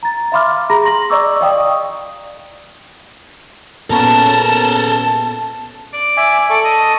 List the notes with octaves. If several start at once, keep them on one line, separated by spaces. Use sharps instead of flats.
A#5 A6
E5 F5 B5 C6 D6 F6
G#4 A#5 B5 A#6
C6 A#6 F#7
D5 D#5 A#5 C#6 D6 E6
D5 D#5 F5 G5 C#6 D#6
A#2 B3 C#4 A4 A#4 A5
D5
E5 G#5 D6
A4 D5 C#6
D#5